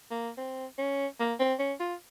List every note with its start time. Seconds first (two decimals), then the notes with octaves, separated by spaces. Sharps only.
0.11 A#3
0.37 C4
0.78 C#4
1.19 A#3
1.39 C4
1.59 C#4
1.80 F4